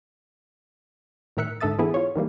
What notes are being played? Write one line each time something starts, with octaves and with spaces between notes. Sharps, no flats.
A2 D#3 A#4 E5 F#6 C#7
G#2 D3 A4 E5 D#6 A6
D3 E3 B3 E4 G#4 A4
F4 C#5
D#3 E3 G3 A#3